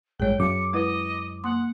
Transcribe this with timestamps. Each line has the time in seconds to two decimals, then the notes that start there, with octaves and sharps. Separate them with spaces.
0.20 A1 G2 G#3 G#4 C#5 G5
0.40 F#2 D6 C#7
0.73 G#3 E4 B4 D#5
1.44 A#3 F#5 C6 D#6